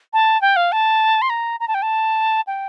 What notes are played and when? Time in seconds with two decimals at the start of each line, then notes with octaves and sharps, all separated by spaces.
0.13 A5
0.42 G5
0.56 F5
0.72 A5
1.22 C6
1.30 A#5
1.60 A#5
1.68 A5
1.74 G5
1.82 A5
2.47 G5